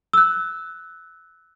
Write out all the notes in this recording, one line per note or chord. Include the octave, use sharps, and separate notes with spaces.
E6 F#6